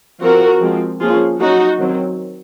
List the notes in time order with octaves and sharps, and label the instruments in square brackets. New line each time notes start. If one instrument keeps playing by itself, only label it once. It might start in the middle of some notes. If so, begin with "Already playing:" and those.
[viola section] F3 C4 F#4 A#4
F3 G#3 C4
F3 A#3 C#4 F4 G#4
F#3 C#4 D#4 F#4
D#3 F#3 C4